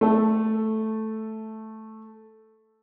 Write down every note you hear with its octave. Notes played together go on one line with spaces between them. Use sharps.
A3 A4